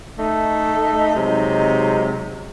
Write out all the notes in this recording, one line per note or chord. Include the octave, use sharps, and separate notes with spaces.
A3 D#4
C3 F#3 G#3 D#4